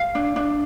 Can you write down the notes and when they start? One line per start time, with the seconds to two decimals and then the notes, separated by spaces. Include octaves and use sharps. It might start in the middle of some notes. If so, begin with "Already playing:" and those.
Already playing: F5
0.15 D4
0.36 D4